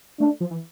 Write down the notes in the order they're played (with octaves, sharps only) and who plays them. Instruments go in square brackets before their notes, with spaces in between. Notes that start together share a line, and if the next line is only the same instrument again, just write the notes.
[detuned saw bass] A3 [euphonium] D4
[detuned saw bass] F3
E3